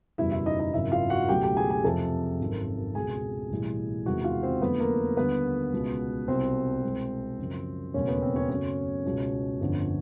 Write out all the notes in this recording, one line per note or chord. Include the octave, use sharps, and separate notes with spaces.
F#1 E2 B2 G3 E4 E5
E4 E5
D#4 D#5
D#4 D#5
G#1 F#2 C#3 E4 E5
F4 F5
F#4 F#5
C#2 B2 F#3 A3 G4 G5
G4 G5
G#4 G#5
G#4 G#5
F2 C3 F3 A4 A5
G#1 F#2 D#3
C#2 B2 G#3 G#4 G#5
B1 A2 E3 G3
E2 C3 D#3 G#3 F#4 F#5
F4 F5
C4 C5
F2 D3 F#3 A3 B3 B4
A#3 A#4
D#2 D3 G3 B3 B4
C#2 B2 G#3
C2 B2 G3 C4 C5
C2 B2 G#3
F#2 C#3 F3
E1 D#2 C#3 F#3 A3 C#4 C#5
B3 B4
C4 C5
C#4 C#5
F#2 C#3 F#3 A3 C#4 C#5
C#2 B2 G#3
G1 F2 D3